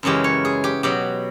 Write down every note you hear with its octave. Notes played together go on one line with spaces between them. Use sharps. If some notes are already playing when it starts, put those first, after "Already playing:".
F#2 C#3 E3 G#3 G4
C#5
G#4
G4
B2 F#3 G4